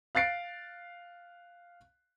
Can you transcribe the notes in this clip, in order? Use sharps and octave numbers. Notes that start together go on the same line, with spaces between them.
F5 F#6 A6 C7 D7